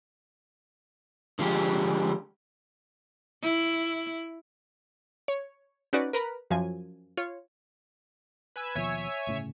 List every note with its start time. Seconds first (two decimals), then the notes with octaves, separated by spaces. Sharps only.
1.39 D3 F3 G#3 G4
3.42 E4
5.28 C#5
5.93 C#4 D#4 F#4 B4 D5
6.13 A#4 B4 A#5 B5
6.50 F#2 F3 G#5
7.17 F4 C#5
8.56 B4 G#5 E6
8.75 D#2 B2 F3 C#5 E5 G#5
9.27 G1 A2 C#3